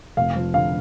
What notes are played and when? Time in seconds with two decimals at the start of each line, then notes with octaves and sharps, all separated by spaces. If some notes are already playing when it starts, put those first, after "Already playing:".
0.17 F1 F5
0.36 F3
0.54 D3 F5